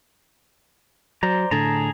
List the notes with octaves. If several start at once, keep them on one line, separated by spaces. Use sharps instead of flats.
F#3 C5 D5 A#5
A2 D3 G#4 A5 A#5